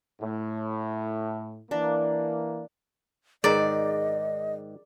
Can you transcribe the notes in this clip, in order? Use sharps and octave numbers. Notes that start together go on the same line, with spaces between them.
A2
E3 A#3 D4
G#2 D#3 G#4 A#4 D5 D#5 A#5